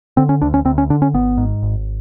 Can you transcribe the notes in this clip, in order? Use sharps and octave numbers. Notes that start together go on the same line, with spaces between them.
D3 C4
C#4
D2 D4
C#4
D2 C4
C#4
D3 D4
C#4
G#1 B3
G#2
G#1